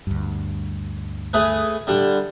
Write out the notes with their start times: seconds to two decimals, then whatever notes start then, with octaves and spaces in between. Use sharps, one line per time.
0.07 D2 G2
1.33 A3 G#4 B4
1.87 D3 G3 D4